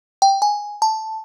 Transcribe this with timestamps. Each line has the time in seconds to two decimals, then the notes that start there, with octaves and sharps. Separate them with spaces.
0.22 G5
0.42 G#5
0.82 A5